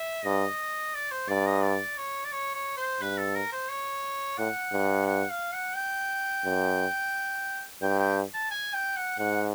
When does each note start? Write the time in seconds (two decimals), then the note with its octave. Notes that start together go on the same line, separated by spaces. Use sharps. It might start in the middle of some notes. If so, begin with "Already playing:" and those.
Already playing: E5
0.25 G2 D#5
0.95 D5
1.11 C5
1.28 G2 D5
1.46 D#5
1.63 D5
1.97 C#5
2.25 D5
2.32 C#5
2.54 C#5
2.77 C5
3.01 G2 B4
3.18 A4
3.35 A#4
3.52 C5
3.69 C#5
4.38 A2 F#5
4.72 G2
5.07 F#5
5.30 F5
5.53 F#5
5.76 G5
6.45 F#2
7.82 G2 G5
7.99 G5
8.34 A5
8.51 G#5
8.73 G5
8.96 F#5
9.19 G#2 F#5